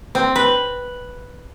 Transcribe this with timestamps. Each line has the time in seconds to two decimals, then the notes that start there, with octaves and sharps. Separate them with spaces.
0.15 C4
0.36 B4